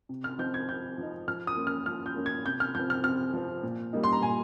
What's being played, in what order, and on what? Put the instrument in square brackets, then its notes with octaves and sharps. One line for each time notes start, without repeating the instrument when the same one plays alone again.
[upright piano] C3
F6
F3 C4 D#4 G6
G#6
C3 G6
F3 C4 D#4
F3 F6
D#6
A#3 C#4
F6
F3 F6
G6
A#3 C#4
G#6
C3 G6
F6
F3 C4 G6
F6
C3 F6
F3 C4
A#2
G3 A#3 D#4
C6
A#5
A#2 G#5